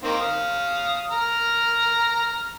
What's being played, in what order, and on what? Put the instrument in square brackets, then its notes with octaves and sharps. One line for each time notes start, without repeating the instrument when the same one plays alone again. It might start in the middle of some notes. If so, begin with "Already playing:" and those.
[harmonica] D#3 A#3 C4
F5 D#6
A#5 F6